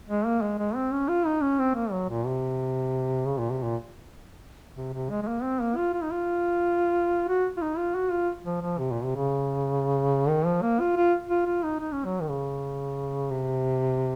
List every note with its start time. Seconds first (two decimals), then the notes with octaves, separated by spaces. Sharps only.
0.09 G#3
0.26 A#3
0.42 G#3
0.58 G#3
0.76 C4
0.92 C#4
1.09 F4
1.26 D#4
1.42 C#4
1.59 C4
1.75 A#3
1.92 F#3
2.09 A#2
2.26 C3
3.26 C#3
3.39 A#2
3.51 C3
3.63 A#2
4.76 C3
4.93 C3
5.10 G#3
5.23 G#3
5.28 A#3
5.43 C4
5.61 A#3
5.77 F4
5.93 F4
6.03 D#4
6.11 F4
7.28 F#4
7.57 F4
7.62 D#4
7.77 F4
7.95 F#4
8.12 F4
8.46 F3
8.61 F3
8.78 C3
8.92 A#2
9.04 C3
9.15 C#3
10.28 D#3
10.46 F3
10.62 A#3
10.80 F4
10.96 F4
11.29 F4
11.46 F4
11.63 D#4
11.80 D#4
11.92 C#4
12.05 F#3
12.21 D#3
12.30 C#3
13.31 C3